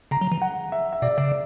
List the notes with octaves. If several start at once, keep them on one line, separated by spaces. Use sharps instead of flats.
C#3 A#5
F#3
E3
F#5
E5
E5
B2 D5
E5
C#3 D5